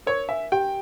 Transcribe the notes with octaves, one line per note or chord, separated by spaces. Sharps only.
A#4 C#5
E5 G#5
G4 G5